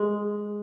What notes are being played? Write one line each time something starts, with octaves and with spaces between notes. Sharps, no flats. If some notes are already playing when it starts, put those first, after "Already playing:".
Already playing: G#3